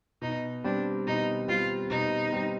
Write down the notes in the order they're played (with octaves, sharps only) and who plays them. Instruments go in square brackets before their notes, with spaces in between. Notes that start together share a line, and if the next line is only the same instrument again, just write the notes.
[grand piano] B2 [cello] D#4
[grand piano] G3 C4 [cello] D4
[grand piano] B2 [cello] D#4
[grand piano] G3 C4 [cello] F4
[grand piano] B2 [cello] D#4
[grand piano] G3 C4